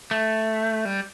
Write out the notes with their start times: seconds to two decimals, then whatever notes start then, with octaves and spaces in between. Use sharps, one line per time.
0.11 A3
0.85 G3